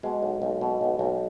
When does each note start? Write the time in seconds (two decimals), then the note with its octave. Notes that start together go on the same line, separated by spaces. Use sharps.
0.03 B2 G#3
0.22 B1
0.42 B1
0.61 B2
0.81 B1
0.99 B1